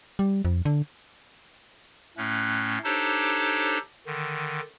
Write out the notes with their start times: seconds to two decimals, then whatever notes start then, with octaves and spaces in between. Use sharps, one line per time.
0.19 G3
0.45 F2
0.65 D3
2.17 A2 A3 C#4 F#6
2.84 D4 D#4 G4 A4 C5 C#5
4.06 D3 D#3